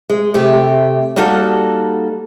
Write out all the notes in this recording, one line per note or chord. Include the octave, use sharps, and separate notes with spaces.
G#3
C3 A3 G4
G3 A#3 D#4 F#4 A4